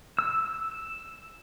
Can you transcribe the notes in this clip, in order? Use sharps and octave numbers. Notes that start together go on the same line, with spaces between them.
E6